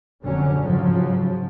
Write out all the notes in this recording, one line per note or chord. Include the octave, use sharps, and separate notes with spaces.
F1 D3 F#3 C#4
G#2 C#3 F3 F#3